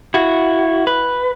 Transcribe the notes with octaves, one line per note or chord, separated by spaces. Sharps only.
E4 F#4
B4